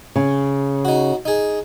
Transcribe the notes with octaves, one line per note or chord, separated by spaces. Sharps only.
C#3
D#4 F#4
D#4 G#4